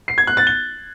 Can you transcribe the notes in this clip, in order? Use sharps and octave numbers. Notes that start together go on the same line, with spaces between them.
C7
G#6
F#6
A6
G7